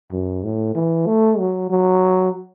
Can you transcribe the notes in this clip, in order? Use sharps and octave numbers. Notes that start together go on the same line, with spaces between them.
F#2
A2
E3
A3
F#3
F#3